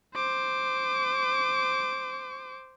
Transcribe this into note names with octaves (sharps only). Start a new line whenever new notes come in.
C5 D6